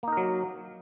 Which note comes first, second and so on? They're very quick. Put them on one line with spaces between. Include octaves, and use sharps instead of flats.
A#3 D#4 A#4 F#3